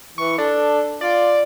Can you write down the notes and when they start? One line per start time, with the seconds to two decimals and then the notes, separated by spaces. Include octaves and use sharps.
0.18 E3 C#6
0.38 D4 A4
1.01 F4 D5